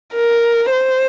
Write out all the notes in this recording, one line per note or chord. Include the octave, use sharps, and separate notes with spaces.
A#4
C5